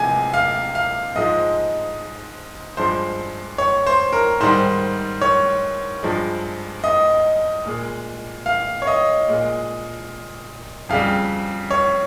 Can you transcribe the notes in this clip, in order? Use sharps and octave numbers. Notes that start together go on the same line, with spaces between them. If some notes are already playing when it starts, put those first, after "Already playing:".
Already playing: C3 F3 G#3 G#5
F5
F5
G#2 F3 G#3 D#5
G2 F3 G#3 C5
C#5
C5
A#4
G#2 D#3 G3 C5
C#5
G2 F3 G#3
D#5
A#2 G#3
F5
C#5
D#5
A#2 G#3
F2 C#3 G3 F5
C#5